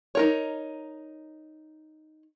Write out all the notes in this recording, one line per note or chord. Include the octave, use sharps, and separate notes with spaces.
D#4 A#4 C#5